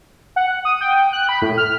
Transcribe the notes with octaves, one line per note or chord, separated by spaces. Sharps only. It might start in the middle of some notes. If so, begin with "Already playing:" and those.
F#5
D#6
G5
F#6
B5
A2
F6